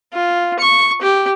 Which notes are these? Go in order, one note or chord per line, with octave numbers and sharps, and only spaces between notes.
F4
C#6
G4